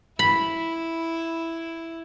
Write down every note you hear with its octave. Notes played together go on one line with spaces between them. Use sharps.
E4 B5